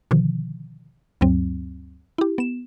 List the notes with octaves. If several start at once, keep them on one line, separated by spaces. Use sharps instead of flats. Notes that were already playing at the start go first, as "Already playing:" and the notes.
B2 D3 D#3 F3
D2 G2 F#3 C4
E4 G4
B3 E7